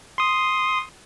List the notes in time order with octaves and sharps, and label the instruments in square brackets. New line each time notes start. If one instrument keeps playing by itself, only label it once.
[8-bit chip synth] C6 D#6